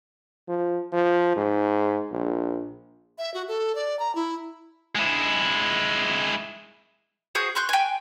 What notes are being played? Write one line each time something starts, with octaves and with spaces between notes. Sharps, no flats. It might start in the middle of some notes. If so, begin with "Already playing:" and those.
F3
F3
G#2
A#1
E5
F#4
A4
D5
A#5
E4
G#3 E4
F#4 G#4 C5 D#6
C6 C#6 F#6 G6
G5 G#5